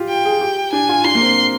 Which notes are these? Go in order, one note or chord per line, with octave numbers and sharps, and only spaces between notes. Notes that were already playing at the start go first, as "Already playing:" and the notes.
Already playing: F4 G4
G5
G#4
G4
D4 G#5
F4
D4 C6
A#3
C4